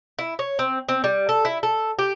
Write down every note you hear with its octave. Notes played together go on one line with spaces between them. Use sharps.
E4
C#5
C4
C4
G3
A4
E4
A4
G4